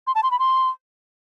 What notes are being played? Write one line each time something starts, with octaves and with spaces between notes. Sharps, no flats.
C6
A5
C6
B5
C6